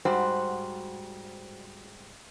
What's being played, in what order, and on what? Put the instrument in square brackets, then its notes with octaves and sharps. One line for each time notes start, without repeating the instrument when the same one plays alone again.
[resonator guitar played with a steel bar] G#2 G3 F#4 C5